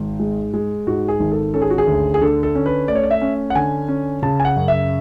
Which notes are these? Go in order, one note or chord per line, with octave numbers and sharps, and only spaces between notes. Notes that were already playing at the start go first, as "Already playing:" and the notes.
Already playing: G#1 G#2
G#3
G#3
G#2 F#4
G#4
G#1
A4
C#4 A4
G#4
F#4
G#4
D2
G#4
D3 A4
A4
C#4
B4
A3 D5
C#5
D5
E5
C#4
F#5
D3 G#5
C#4
C#3 A5
G#5
F#5
F#2
E5